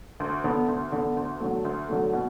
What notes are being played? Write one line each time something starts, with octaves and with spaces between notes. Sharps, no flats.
D2
D3 B3
D2
D3 B3
D2
D3 F#3 A3
D2
D3 F#3 A3
B2